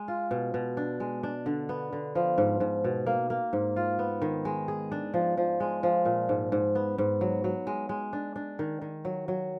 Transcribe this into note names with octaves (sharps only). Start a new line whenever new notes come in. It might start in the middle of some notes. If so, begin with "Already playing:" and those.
Already playing: G#3
F4
B2
B2
D4
G#3
D4
D3
B3
D3
F3
G#2
G#2
B2
A#3
A#3
G#2
F4
B3
D#3
G#3
G#4
D4
F3
F3
G#3
F3
A#2
G#2
G#2
B3
G#2
F#3
F#3
G#3
G#3
D4
D4
D#3
D#3
F#3
F#3